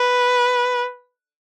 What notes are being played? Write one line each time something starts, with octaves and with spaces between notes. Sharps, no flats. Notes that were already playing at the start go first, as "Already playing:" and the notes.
Already playing: B4